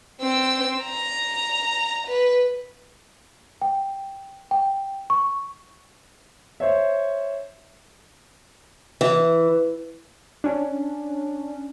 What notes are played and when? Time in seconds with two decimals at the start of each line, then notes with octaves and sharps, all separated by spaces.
0.21 C4 E6
0.84 A#5
2.08 B4
3.62 G5
4.51 G5
5.10 C#6
6.60 C5 C#5 E5
9.01 E3
10.44 C#4 D4